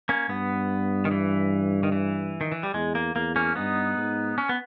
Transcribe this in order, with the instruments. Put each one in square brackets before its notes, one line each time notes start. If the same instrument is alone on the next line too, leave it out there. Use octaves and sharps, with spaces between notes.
[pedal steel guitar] A#3 C#4
[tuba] G2 [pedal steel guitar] B3
[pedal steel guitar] D#3
E3
D#3
E3
D#3
E3
G3
[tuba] E2 [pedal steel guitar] G#3
[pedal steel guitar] A#3
[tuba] E2 [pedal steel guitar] A#3
[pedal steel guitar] A#3 C#4
[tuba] G2 [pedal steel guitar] B3 D#4
[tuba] G#2
[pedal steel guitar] C#4
B3